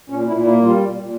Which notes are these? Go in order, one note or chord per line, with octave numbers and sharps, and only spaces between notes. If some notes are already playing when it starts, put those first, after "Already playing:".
A#2 C#4
A#2 E4
A#3 E4
G3 F4
A#2
A#2